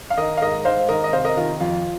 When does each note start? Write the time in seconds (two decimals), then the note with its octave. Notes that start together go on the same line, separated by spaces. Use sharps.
0.10 F5
0.17 D#3 A#4 D#5
0.37 F5
0.42 G#2 A#4 D#5
0.65 G#2 C5 F5
0.89 D#3 A#4 D#5
1.04 D#5
1.13 C3 C5 F5
1.25 A#4 D#5
1.37 D#3 F4 A#4
1.60 F2 F4